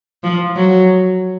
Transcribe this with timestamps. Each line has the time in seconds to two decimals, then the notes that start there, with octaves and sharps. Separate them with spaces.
0.23 F3
0.56 F#3